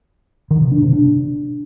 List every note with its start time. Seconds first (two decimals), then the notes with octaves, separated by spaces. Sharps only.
0.51 D#3
0.61 C3
0.72 D4
0.82 C3
0.93 D4